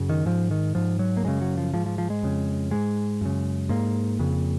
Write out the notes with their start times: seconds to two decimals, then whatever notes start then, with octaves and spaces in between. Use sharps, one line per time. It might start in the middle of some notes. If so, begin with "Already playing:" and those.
Already playing: F#2 C#3
0.09 D#3
0.26 G#2 F3
0.51 D#3
0.75 G#2 F3
0.99 F#3
1.17 A#3
1.24 F#2 C#3 G#3
1.41 F#3
1.57 F3
1.74 G#2 F3
1.86 F3
1.98 F3
2.10 G#3
2.23 F2 C#3
2.71 G#2 G#3
3.21 F#2 C#3
3.69 G#2 A#3
4.19 F2 C#3